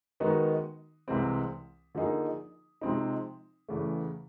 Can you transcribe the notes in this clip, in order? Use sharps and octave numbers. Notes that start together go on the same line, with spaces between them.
D#3 G#3 B3 D#4 F#4
C2 C3 E3 G#3 C4
D3 F3 A#3 D#4 G#4
C3 F3 G#3 C4 D#4
E2 C#3 E3 A3